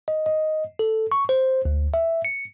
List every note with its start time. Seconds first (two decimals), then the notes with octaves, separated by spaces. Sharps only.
0.08 D#5
0.26 D#5
0.79 A4
1.12 C#6
1.29 C5
1.65 D2
1.94 E5
2.25 C#7